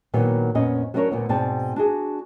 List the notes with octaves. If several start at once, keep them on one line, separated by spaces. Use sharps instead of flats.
A#2 D#3 F#3 B3
F2 A#2 B3 C#4 D#5
F#3 B3 C#4 D4 A#4 C#5
D2 A#2 A#3 B3
G#2 B2 C4 D5 G5 A5
D4 F#4 G#4